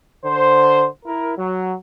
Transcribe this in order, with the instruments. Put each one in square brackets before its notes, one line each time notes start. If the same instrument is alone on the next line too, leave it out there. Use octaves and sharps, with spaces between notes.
[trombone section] D3 C5
E4 A#4
F#3